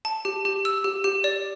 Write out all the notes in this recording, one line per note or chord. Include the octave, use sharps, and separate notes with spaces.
A5
G4
G4
E6
G4
G4
D5